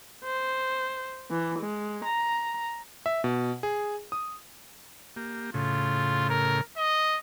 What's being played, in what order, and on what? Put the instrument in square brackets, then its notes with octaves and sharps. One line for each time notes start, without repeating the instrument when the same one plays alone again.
[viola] C5
E3
G#3
A#5
[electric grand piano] E5
B2
G#4
D#6
[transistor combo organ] A#3 G4
[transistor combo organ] A2 C#3 [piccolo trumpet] F4
[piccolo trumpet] A#4
D#5